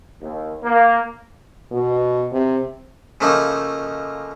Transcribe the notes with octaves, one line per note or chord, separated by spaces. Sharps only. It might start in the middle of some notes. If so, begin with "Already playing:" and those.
D#2
A#3
B2
C3
C#3 F3 A3 A#3 D#4